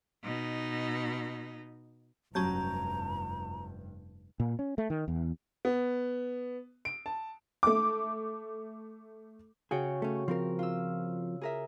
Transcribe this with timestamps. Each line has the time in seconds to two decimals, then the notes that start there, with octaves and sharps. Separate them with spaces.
0.23 B2 D#4
2.35 F1 G2 F#3 C#4 A5 A#5 G6
4.40 A#2
4.59 C#4
4.78 A3
4.90 D#3
5.08 E2
5.65 B3
6.85 D7
7.06 A5
7.63 A3 D6
9.71 C#3 F#4 G#4 G5
10.02 A3 C#4
10.28 F3 C4 A#4
10.59 F4 E6
11.41 G#4 A#4 E5